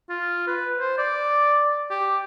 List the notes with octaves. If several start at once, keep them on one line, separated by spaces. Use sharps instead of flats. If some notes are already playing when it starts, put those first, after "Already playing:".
F4
B4
C5
D5
G4